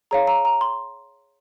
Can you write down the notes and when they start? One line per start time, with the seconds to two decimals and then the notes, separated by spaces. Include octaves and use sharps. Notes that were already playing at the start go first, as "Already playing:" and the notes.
0.11 G#4 C#5 F5 A#5
0.27 A#5
0.45 A#5
0.61 C6